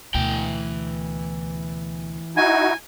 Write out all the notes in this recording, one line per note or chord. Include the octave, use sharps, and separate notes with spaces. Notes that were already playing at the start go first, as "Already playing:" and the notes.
D2 B2 E3 G5
D#4 E4 F#4 G#5